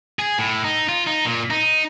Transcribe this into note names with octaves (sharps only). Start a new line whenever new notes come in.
G#4
A2
D#4
F4
D#4
A#2
D#4